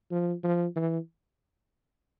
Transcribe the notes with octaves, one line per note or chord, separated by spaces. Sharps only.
F3
F3
E3